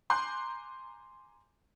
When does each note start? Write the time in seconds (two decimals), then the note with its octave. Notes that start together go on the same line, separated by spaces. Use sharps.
0.10 G#5 A#5 C6 D6 F#6 G6